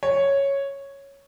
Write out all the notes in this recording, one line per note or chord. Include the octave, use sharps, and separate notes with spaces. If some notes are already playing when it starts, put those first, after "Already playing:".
C#5